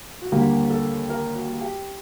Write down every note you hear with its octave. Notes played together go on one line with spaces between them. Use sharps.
F#4
D#2 D3 G3 A#3 G4
A4
A#4
F#4
G4